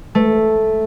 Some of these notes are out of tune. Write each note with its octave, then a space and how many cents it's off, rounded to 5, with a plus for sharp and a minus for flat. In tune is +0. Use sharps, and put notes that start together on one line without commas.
A3 -5